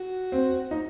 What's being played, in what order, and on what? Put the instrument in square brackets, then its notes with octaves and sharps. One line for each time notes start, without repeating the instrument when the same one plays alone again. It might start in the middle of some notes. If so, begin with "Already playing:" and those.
Already playing: [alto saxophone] F#4
[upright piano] C4
D#4